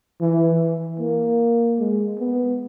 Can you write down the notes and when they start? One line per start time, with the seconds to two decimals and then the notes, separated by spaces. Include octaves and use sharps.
0.21 E3
1.00 A#3
1.79 G#3
2.19 B3